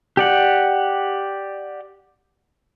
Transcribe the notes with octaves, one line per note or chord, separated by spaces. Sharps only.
G4 D5 F#5